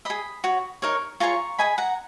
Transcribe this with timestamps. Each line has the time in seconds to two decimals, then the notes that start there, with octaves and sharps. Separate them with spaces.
0.05 G#4 D#5 B5 D#6
0.44 F#4 C#5
0.82 D#4 A#4 C#5
1.20 F4 G#4 C#5 A#5 C#6
1.58 G#4 D#5 G#5 B5
1.78 F#5 A#5